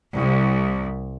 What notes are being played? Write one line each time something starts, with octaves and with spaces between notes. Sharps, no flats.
C2